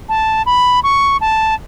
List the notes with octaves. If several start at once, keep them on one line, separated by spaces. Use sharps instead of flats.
A5
B5
C#6
A5